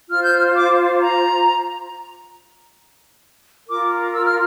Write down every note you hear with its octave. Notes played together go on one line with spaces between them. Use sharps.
F4 C5 F6
G6
F6
D6
A#5
F4 A#4 D6
E6
F6